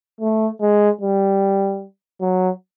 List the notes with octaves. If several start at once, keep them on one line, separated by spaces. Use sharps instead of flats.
A3
G#3
G3
F#3